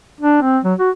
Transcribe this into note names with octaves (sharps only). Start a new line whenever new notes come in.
D4
C4
F#3
F#4